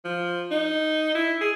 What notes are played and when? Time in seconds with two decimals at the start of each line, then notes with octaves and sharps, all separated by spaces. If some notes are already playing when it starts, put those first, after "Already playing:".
0.05 F3
0.51 D#4
1.15 E4
1.41 G#4